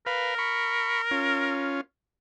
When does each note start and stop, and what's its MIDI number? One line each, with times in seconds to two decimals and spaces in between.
0.06 1.81 70
0.06 0.35 71
0.06 0.35 77
0.38 1.02 83
0.38 1.02 85
1.11 1.81 61
1.11 1.81 65